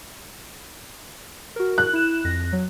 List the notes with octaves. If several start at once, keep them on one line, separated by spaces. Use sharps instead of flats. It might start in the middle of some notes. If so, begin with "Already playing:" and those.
F#4 A#4
F#6
E4 E7
F2 A#6
F#3